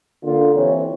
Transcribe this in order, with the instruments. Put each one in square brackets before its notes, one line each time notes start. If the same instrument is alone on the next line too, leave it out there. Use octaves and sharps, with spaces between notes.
[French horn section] D3 A#3 F4
E3 G3 C4 C#5